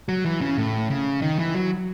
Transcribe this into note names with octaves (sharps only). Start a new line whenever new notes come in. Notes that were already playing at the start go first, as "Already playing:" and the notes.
F#3
E3
C#3
A2
C#3
D#3
E3
F#3